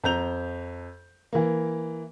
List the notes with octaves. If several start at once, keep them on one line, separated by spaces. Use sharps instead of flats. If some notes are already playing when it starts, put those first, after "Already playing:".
F2 A#5 G6 F7
E3 A#3